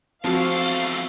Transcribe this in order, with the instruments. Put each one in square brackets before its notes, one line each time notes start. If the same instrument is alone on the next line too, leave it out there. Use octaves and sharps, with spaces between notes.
[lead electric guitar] E2 A4 [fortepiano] F3 [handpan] C4 F#4 [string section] F5